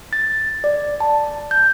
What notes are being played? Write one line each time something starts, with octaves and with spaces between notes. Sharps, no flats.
A6
D5
A5
G6